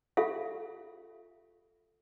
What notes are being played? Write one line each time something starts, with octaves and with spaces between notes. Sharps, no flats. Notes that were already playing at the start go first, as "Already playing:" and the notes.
F4 G4 A4 E5 F5